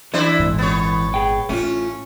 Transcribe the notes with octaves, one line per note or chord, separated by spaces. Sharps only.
E3 D4 E4 F#4 A4 C5
G#1 A#2
B3 C#5
G#4 G5
A1 A3 C#4 E4 F4